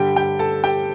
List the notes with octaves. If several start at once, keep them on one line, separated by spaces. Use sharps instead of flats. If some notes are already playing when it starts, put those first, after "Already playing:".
Already playing: G2 D3 G3 G4 G5
G4 G5
A4 A5
G4 G5